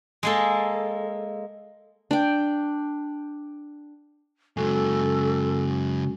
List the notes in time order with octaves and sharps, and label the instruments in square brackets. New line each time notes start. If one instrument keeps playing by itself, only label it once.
[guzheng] G#3 A#3 A4
[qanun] D4 G5
[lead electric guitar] F#2 C#3 [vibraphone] G#3 C#4 F#4 [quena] A4